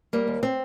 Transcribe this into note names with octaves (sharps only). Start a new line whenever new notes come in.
G3 A#3
D#2
C4